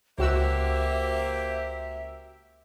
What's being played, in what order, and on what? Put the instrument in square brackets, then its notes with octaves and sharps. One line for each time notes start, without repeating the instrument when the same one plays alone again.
[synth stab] C#2 F#4 E6 [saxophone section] A#3 G4 C5 [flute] E5